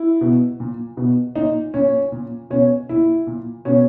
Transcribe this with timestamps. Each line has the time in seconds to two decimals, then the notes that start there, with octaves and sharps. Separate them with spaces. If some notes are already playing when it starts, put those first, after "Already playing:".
Already playing: E4
0.21 B2
0.60 A#2
0.97 B2
1.35 A#2 D#4
1.74 A#2 C#4
2.12 A#2
2.50 B2 C#4
2.89 A#2 E4
3.27 A#2
3.65 B2 C#4